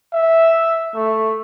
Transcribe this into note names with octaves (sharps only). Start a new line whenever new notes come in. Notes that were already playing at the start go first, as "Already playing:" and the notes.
E5
A3